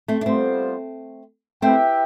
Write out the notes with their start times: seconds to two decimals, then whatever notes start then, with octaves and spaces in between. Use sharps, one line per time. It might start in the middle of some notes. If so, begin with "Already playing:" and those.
0.08 A3 C4
0.21 D4
0.26 G3 A3 B3 C4 F4 C5
1.62 A3 C4 E4 G4 B4 E5 G5